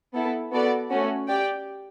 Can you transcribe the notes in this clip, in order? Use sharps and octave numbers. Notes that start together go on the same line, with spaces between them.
B3 E4 A4
B3 F#4 A4 D5
A3 C#4 F#4
G4 D5 G5